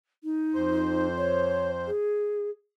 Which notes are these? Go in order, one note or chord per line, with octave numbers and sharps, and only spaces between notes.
D#4
F2 C5
C#5
G#4